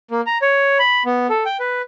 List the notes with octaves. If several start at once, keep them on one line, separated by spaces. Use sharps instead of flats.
A#3
A#5
C#5
B5
B3
A4
G5
B4